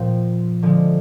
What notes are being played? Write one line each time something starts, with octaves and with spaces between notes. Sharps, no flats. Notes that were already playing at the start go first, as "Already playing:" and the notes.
Already playing: A#2 F3 C4
D3 F3 G#3